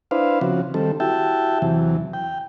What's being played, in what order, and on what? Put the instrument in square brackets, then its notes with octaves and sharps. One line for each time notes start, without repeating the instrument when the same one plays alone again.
[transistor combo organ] D4 E4 B4 C5 F5
C#3 F3 C4 F#4
D#3 G3 C4 A4
E4 F#4 G4 E5 G5 A5
E2 C3 E3 F#3
G5